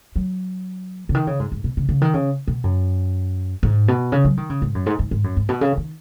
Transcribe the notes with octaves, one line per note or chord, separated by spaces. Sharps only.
F#3
C#3
D#3
C#3
G#2
G#2
B2
C#3
C#3
D#3
C#3
B2
F#2
G#2
B2
C#3
F#3
D#3
C#3
G#2
F#2
G#2
G#2
G#2
F#2
G#2
B2
C#3
D#3